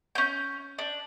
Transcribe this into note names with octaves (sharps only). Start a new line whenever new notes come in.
C#4 G6
D4